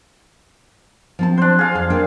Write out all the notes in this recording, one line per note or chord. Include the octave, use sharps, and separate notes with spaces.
F3 C4 A5
D4 C5
G#4 F5
F2 A5
A#3 D4 G5